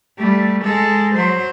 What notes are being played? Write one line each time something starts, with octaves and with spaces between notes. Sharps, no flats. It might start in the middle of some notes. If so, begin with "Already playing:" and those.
G3 A3
G#3 A4
F#3 C5